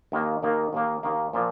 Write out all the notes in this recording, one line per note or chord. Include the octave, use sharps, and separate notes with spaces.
D#2 D#3 A#3
D#2 D#3 A#3
D#2 D#3 A#3
D#2 D#3 A#3
A#2 F3 A#3 F4